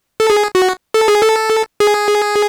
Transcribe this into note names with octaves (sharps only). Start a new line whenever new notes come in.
A4
G#4
F#4
A4
G#4
A4
G#4